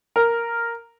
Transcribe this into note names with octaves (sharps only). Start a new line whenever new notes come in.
A#4